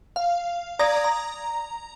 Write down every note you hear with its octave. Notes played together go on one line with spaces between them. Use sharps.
F5
D5 A#5 D#6 G#6 A#6
A#5